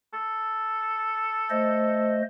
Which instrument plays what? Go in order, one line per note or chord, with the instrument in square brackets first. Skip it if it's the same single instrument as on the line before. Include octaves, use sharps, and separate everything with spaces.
[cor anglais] A4
[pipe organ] A3 C5 D#5